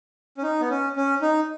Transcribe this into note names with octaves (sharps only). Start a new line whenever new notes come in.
C#4
D#4
B3
C#4
C#4
D#4